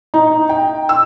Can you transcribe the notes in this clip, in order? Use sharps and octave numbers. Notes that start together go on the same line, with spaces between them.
D#4
G5
E6